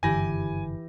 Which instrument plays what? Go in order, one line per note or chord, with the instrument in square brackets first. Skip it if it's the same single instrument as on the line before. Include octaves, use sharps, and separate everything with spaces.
[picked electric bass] F#1 G2 D3 [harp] E3 E4 G4 [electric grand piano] G#5 A#6